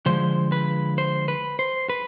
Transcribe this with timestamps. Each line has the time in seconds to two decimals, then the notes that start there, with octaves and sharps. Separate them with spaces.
0.06 D3 F3 G#3 C5
0.52 B4
0.98 C5
1.28 B4
1.59 C5
1.90 B4